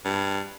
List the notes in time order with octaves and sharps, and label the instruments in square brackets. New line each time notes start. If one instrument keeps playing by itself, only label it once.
[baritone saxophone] G2